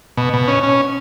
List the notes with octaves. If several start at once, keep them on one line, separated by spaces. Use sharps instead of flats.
B2
B2
C#4
C#4